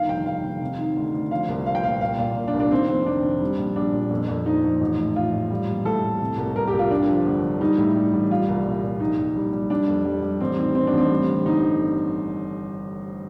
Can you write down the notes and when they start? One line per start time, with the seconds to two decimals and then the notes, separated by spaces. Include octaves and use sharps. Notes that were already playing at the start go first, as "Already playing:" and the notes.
Already playing: G1 D#3 F5
0.08 F1 G5
0.26 F1 F5
0.44 F1
0.61 C3
0.78 D#3
0.96 D2
1.14 D2
1.31 F3 F5
1.48 C2
1.66 F3 F5
1.75 G5
1.83 A#2 F5
2.01 C2 F5
2.18 A#2 F5
2.36 A#2
2.48 D4
2.54 C2
2.60 D4
2.71 D#3 C4
2.88 F1 C4
3.06 D#3 D4
3.24 F1
3.41 G3
3.58 A#1
3.76 A#1 D4
3.93 A#2
4.11 F2
4.28 F2
4.46 F3 D#4
4.64 F2
4.81 A1
4.98 A2
5.16 A2 F4
5.33 A1
5.51 G3
5.69 A#1
5.85 A2 A4
6.03 A2
6.21 C3
6.38 C2
6.56 C2 A#4
6.68 G4
6.73 C2
6.79 F4
6.90 G2 D4
7.09 F3
7.26 G1
7.43 G1
7.61 G3 D#4
7.78 A2
7.96 G3
8.13 A1
8.31 G3 F4
8.48 C2
8.66 A#2
8.83 C2
9.00 A#1 D#4
9.18 A#1
9.36 G3
9.53 G3
9.70 G3 D4
9.88 F2
10.05 G3
10.23 G3
10.41 A1 C4
10.58 D#3 C4
10.75 D#3 C4
10.87 D4
10.93 A1 C4
11.10 G3
11.27 D3
11.45 G1 D#4